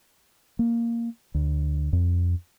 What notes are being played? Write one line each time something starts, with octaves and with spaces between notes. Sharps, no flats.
A#3
D2
F2